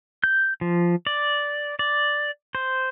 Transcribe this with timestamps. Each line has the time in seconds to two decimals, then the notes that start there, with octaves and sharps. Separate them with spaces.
0.24 G6
0.61 F3
1.07 D5
1.79 D5
2.55 C5